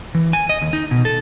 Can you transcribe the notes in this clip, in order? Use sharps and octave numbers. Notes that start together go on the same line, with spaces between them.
E3
G#5
D#5
D#2
D#4
B2
A4